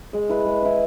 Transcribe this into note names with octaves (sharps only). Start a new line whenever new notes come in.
G#3
E4 B4
G#3
E4 B4